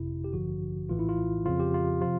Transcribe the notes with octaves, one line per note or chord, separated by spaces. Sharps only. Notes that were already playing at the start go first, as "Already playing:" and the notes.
Already playing: G1 F2 C3 E4
G4
A1 G2 D3 F3 F#4
A#1 A2 E3 F4
E4
F4
F2 C#3 F3 F4
G4
F4
C3 F3 F4